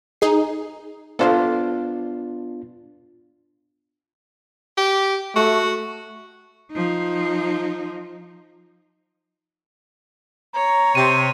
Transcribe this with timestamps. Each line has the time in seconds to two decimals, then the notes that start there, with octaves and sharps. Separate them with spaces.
0.21 D#4 G#4 C7
1.19 B3 D4 F4 A4 C5 F5
4.77 G4
5.36 A3 F#4
6.72 F3 D#4
10.55 C#5 A#5
10.95 C3 C5 D#7